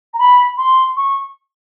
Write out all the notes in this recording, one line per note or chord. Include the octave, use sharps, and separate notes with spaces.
A#5
B5
C6
C#6